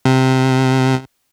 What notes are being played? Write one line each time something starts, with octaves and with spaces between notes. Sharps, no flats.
C3